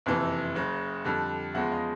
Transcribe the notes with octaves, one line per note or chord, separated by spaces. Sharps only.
F#1 F2 C3 E3
F#1 F#2 C#3
F2 D3 G3
E2 C#3 F3 G#3 E5 F#5
D#5 F5